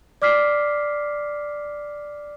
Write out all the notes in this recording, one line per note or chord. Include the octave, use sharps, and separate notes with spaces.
D5 D6 F6 B6 C7